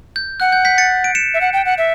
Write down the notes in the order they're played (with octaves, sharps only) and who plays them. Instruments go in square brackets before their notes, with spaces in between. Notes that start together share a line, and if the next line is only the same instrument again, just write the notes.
[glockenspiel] G6
[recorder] F#5 [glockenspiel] F#6
[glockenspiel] G6
G6 B6
A6 C#7
D7
C#7 E7
[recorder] E5
F#5
G5
F#5
E5